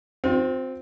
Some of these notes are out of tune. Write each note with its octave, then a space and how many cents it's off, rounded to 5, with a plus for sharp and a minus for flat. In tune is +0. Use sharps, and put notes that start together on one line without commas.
C4 -5 F4 +40